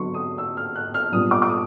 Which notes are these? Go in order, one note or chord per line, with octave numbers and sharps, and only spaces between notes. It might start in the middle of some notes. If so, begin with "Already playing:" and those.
Already playing: D3 F#3 B3 C6 C#6
D#6
E6
F6
F#6
F6
A#2 G3 B3 D4 D#6
D6
D6
D#6